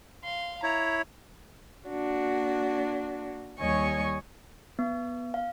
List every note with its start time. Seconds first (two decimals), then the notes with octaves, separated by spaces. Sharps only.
0.24 F5 C6
0.63 E4 C#5 A#5
1.88 A#3 D4 F#4
3.59 D#2 G3 C#5 D#5 G#5 C#6
4.79 B3
5.34 F5